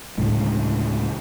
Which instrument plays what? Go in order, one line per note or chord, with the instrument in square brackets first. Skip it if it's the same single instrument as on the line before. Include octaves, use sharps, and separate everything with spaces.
[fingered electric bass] D2 A2 C#3 G#3